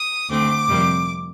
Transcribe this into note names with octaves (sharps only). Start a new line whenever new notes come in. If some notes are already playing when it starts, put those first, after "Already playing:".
Already playing: D#6
D2 D3 A3 C4 D6
F2 C3 G3 A#3